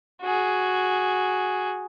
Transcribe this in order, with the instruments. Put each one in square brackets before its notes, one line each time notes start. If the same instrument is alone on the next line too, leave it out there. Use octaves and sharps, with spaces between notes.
[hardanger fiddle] F#4 G#4